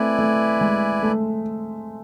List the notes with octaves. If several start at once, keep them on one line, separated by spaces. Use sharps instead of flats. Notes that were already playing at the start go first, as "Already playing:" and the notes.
Already playing: A3 C4 E4 B4 D5 G#5
A3
G#3
A3